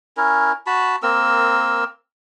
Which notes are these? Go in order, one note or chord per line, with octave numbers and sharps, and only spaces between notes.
C#4 E4 A#4
F#4 A5 B5
A#3 C4 A#4 E6